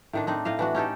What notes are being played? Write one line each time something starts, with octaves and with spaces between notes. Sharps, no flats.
A2 D#3 D4
C4 D4 D#4
A2 D#5 F5
E3 D4 F#4
C#4 D#4 G4 A4